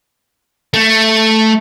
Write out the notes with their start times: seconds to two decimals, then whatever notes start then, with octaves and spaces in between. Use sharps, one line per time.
0.74 A3